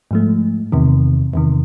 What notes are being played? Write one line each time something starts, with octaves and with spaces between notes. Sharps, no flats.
G#2 F3 A3
E2 C3 D#3
E2 C3 D#3